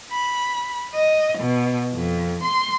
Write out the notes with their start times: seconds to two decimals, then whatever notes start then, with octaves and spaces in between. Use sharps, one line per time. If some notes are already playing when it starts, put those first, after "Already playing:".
0.12 B5
0.93 D#5
1.38 B2
1.94 F2
2.43 C6